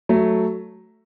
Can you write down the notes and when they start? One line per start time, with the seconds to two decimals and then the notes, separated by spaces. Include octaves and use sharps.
0.09 F#3 A3